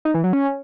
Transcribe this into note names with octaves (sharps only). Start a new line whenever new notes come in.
D#4
E3
F#3
C#4